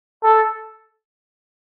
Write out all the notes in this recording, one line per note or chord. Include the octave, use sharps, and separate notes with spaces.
A4